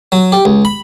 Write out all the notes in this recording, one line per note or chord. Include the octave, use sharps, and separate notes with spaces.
F#3
G4
C#2
B5